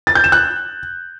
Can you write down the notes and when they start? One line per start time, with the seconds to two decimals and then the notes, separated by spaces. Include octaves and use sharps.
0.07 A6
0.15 G6
0.24 E7
0.32 F#6